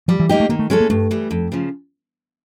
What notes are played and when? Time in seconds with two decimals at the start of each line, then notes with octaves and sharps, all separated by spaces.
0.08 F3 G3
0.19 E3
0.29 G#3 A#3 D#4 G4
0.40 A3
0.49 D#3 A#3
0.59 A3
0.70 F#3 G#3 C#4 E4 A4
0.80 A#3
0.90 G2 A3
1.11 E3 G3
1.31 F2
1.52 C#3 F3